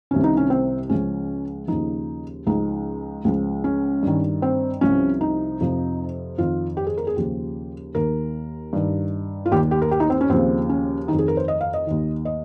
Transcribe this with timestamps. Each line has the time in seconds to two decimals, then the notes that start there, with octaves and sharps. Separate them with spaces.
0.11 C2 C3 D#3 C#4
0.24 D#4
0.37 C#4
0.50 C4
0.89 C#2 C#3 F3 C#4
1.68 D#2 C#3 F3 D#4
2.46 C#2 C#3 F3 D#4
3.25 C#2 C#3 F3
3.64 C#4
4.03 G2 D#3
4.42 C4
4.81 C2 C3 F3 C#4
5.21 D#4
5.60 F2 C3 F3
6.38 F2 D#3 F4
6.77 G4
6.87 G#4
6.97 A#4
7.07 G#4
7.16 D#2 C#3 F3 G4
7.95 D#2 D#3 A#4
8.73 G2 D#3
9.46 F4
9.51 D#2 D#3 G4
9.71 G4
9.82 A#4
9.91 G4
10.00 D#4
10.10 C4
10.21 C#4
10.29 D#2 C#3 F3 C4
10.69 C#4
11.08 F2 D#3 D#4
11.19 G#4
11.28 A#4
11.37 C5
11.48 D#5
11.61 F5
11.74 D#5
11.87 D#2 D#3
12.25 D#5